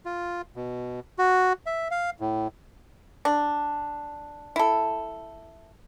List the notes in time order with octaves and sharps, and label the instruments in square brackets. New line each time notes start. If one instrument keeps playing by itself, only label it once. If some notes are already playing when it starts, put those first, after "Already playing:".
[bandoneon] F4
B2
F#4
E5
F5
A2
[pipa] D4
E4 A4